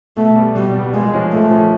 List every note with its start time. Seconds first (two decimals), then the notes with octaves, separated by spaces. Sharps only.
0.17 B2 A3
0.36 G3 B3
0.55 B2 G3
0.74 G3 B3
0.93 A#2 G#3
1.12 F3 G#3 C#4
1.32 A#2 A3
1.51 F3 G#3 C#4